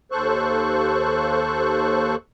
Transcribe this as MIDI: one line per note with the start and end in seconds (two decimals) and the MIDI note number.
0.12 2.16 39
0.12 2.16 69
0.12 2.16 72
0.12 2.16 85
0.12 2.16 90